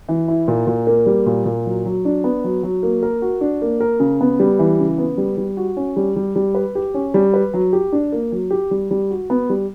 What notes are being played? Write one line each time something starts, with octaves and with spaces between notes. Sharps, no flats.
E3
E4
A#2
A#2
A#3
G3
A#2
A#2
F#3
F#3
D4
B3
F#3
F#3
A#3
A#4
F#4
D4
A#3
A#4
C#3
B3
G3
E3
C#3
B3
G3
G3
F#4
C#4
G3
G3
G3
B4
G4
C#4
G3
B4
F#3
G4
D4
A#3
F#3
G4
G3
G3
F#4
B3
G3